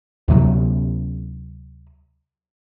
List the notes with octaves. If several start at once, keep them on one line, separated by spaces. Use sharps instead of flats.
D2 C3 F#3